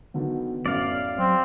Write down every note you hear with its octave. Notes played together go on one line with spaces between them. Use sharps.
D3 D#3 F#3 B3
F#2 A2 D5 F5
F#3 C4